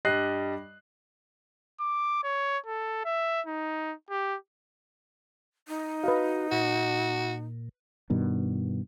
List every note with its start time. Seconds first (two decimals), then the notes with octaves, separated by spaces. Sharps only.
0.05 G2 G3 D#5 F#6 C7
1.81 D6
2.24 C#5
2.67 A4
3.05 E5
3.47 D#4
4.10 G4
5.68 D#4
6.04 F#4 B4 D#5 F5
6.52 A#2 F#4
8.10 G2 B2 D#3